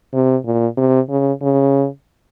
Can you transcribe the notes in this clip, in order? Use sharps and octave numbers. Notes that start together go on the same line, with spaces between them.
C3
A#2
C3
C#3
C#3